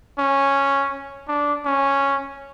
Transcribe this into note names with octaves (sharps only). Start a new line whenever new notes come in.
C#4
D4
C#4